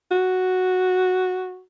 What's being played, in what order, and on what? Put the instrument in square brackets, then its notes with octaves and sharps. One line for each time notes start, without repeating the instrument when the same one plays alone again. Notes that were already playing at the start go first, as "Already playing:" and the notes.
[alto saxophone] F#4